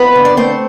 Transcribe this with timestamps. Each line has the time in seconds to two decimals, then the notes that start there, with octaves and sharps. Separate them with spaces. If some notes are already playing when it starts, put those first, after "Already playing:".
Already playing: F2 B3 B4
0.15 D3
0.25 D5
0.37 A3 C4 C5